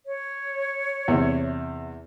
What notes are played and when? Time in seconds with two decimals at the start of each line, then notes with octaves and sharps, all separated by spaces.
0.06 C#5
1.08 E2 C3